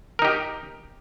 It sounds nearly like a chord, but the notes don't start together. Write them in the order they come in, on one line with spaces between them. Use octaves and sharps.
A#4 D#4 G4